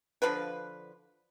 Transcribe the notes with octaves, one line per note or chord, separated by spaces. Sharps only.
D3 F3 F4 B4